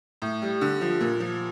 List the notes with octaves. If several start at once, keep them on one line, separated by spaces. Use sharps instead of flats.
A2
G3
D3
F3
A#2
F3